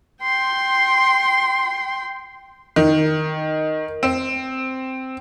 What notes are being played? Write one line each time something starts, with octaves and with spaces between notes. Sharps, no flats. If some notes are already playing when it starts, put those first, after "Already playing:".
G5 C6
D#3
C4